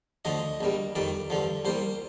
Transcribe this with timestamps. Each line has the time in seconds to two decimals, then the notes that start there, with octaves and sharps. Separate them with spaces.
0.25 D2 D3 F3 D#5
0.61 A#1 A#2 G3
0.95 F2 D#3 G3 D5
1.30 G2 D3 F3
1.65 C2 A#2 G3 C5